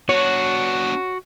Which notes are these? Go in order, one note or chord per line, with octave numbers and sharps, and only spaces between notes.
B3 D4 F#4 C#5